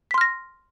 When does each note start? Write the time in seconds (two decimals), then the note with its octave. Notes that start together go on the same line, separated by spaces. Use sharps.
0.11 B6
0.14 C6
0.18 F6
0.21 A#6